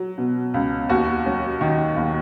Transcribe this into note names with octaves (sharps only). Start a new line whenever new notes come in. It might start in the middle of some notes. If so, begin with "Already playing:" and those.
Already playing: F#3
B2
C#2
D#2 F#4
F#3
D#3
D#2